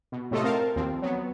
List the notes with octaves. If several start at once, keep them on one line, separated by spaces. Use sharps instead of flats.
B2
A2 C3 A3 F4 A4 D#5
C4 A#4 F5 A5
D#2 F3 C4
F#3 B3